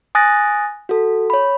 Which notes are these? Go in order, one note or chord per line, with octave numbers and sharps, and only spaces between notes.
G#5 D#6 F#6 A6 A#6
F#4 A4
C#5 B5